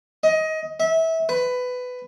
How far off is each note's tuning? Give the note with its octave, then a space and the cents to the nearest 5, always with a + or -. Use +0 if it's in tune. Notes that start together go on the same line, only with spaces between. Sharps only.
D#5 +20
E5 -25
B4 +15